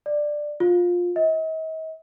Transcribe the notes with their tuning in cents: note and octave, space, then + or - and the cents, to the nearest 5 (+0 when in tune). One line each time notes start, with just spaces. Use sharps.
D5 +10
F4 +15
D#5 +45